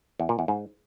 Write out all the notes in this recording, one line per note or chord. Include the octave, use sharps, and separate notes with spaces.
E2
A#2
E2
G#2